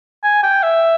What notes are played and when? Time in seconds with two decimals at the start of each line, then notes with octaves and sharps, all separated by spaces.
0.23 G#5
0.43 G5
0.63 E5